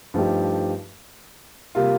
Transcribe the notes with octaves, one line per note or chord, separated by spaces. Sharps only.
G2 F3 A3 D#4 G4
C3 G3 A#3 F4